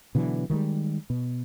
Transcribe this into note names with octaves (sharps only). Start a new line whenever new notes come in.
B2 D3 E3 F#3
D#3 E3 G3 G#3
B2